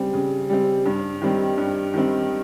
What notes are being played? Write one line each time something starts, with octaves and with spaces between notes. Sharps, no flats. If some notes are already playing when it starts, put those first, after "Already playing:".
Already playing: C#3 G3 C4
C#3
G3 C4
G2
D#3 G3 C4
G2
D#3 G3 C4